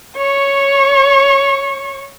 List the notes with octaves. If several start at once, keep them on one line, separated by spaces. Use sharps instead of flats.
C#5 C#6